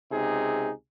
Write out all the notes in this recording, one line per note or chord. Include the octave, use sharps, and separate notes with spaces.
C#2 C3 D#4 G#4